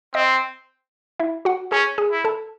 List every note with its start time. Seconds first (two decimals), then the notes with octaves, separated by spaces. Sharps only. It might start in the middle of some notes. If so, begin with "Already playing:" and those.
0.14 C4 D#5 D#6
1.20 E4 E5
1.45 F#4 F#5
1.72 C#4 G#4 G#5
1.98 G#4 G#5
2.12 E4
2.25 A4 A5